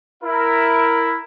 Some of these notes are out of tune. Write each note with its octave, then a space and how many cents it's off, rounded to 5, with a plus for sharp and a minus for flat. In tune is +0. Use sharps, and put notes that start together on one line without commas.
E4 +5 A#4 +0 E5 +0